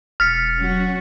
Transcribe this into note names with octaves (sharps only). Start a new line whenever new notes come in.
E1 F6 A6 B6 C#7
F#3 C#4 F#4